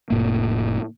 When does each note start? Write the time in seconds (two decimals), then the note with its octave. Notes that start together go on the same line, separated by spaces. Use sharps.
0.10 F1 A2 A#3